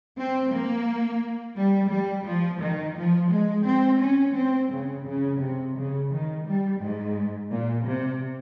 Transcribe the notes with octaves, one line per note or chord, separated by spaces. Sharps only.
C4
A#3
G3
G3
F3
D#3
F3
G#3
C4
C#4
C4
C#3
C#3
C3
C#3
D#3
G3
G#2
A#2
C3